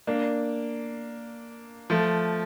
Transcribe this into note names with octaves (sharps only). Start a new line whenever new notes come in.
A#3 D4
F3 A3